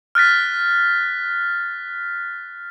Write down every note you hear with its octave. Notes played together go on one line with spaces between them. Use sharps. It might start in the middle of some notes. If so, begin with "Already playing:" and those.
F6 F#6 A6 B6